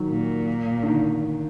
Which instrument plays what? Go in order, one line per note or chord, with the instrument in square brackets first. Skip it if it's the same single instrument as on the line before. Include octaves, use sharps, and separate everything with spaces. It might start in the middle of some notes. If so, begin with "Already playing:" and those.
Already playing: [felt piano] D#3 F#3
[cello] A#2
[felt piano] D3
D#3